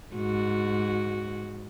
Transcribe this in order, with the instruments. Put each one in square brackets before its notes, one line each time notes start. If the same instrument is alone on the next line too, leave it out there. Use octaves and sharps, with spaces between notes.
[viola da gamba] G#2 F#4